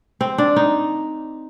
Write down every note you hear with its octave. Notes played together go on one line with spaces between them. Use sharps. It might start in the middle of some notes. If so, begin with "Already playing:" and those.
C4
D4
D#4